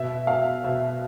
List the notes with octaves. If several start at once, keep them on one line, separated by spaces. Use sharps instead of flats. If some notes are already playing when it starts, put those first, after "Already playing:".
Already playing: B2 E5
F5
B2 E5